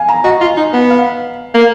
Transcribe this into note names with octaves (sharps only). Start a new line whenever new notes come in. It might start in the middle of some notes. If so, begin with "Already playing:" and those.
Already playing: F5 G#5
A#5
F#4 D#5
F4
D#4
B3
F5
A#3